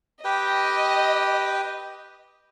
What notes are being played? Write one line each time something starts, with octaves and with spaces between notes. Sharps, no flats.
G4 B4 D#5 G5